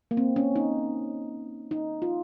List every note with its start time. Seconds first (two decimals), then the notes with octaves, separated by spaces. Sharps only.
0.11 A#3
0.17 C4
0.36 C#4
0.56 D#4
1.71 D#4
2.02 F4